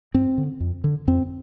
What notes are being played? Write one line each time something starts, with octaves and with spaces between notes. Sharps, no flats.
G2 C4
D3
F2
D3
F2 C4